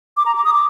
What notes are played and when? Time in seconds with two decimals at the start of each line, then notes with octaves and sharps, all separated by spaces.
0.17 D6
0.26 A#5
0.35 D6
0.45 D#6
0.53 D6